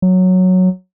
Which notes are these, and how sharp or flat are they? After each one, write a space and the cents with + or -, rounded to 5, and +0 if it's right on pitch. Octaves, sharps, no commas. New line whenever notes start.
F#3 -5